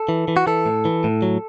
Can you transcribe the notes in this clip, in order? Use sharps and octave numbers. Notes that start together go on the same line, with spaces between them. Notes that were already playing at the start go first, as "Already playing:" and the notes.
Already playing: A4
E3
E3
F#4
E3 A4
A2
E3
A2
F#3